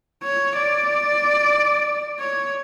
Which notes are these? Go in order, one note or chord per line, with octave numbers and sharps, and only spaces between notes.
C#5
D5
C#5